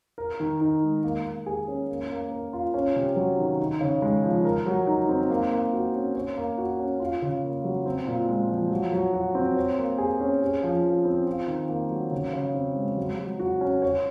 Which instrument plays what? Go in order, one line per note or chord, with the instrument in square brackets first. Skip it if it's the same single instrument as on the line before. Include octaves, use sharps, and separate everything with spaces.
[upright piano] A#4
D#3
D#4
G#3
A#3
A#3
G#4
C#4
A#3
A#3
A#4
F4
C#4
C3
F#3
D#3
D#4
C#3
G#3
F3
A#4
F#3
D#4
C4
A#3
A#3
F#4
C#4
C#5
A#3
F#4
C#4
F4
C#3
A#3
F#3
C4
A#2
G#3
F3
F#3
F#3
F#4
C4
C#5
A#3
G#4
C#4
G#4
F3
F4
C4
F4
D#3
A#3
F#3
C#3
C#3
C4
G#3
F#3
F#3
F#4
C#4
C#5